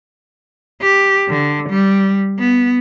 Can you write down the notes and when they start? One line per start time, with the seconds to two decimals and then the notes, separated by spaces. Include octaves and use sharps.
0.82 G4
1.29 D3
1.69 G3
2.38 B3